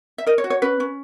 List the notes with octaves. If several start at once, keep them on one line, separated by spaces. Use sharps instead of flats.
E5
A#4 D#5
C#5
F#4
C#5
C#4 B4
C#4